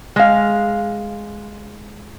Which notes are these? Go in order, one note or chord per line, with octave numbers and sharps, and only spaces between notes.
G#3 F5